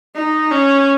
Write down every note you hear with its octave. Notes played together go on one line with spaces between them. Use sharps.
D#4
C#4